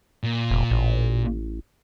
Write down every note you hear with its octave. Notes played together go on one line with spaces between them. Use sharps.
A#2
F1
A1